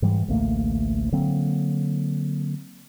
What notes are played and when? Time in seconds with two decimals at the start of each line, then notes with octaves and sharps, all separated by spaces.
0.02 G#2 E3 G3
0.28 A1 D2 A3 A#3
1.12 D3 F#3 A#3 C4